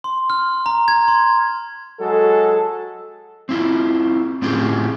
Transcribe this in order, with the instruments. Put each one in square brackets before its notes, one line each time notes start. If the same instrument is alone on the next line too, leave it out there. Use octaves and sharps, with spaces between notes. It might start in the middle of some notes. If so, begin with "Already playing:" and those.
[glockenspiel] C6
F6
A#5
G#6
C6
[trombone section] F#3 G#3 A4
[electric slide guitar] C4 E4 F4
A2 C4 C#4 F4 G4 G#4